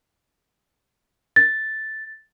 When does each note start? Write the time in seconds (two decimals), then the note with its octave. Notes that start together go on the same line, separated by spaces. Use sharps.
1.36 A6